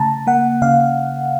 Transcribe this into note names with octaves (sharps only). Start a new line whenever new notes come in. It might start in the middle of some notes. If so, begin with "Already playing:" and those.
Already playing: C#3 A3 A5 A#5
A#3 F#5
C#3 F5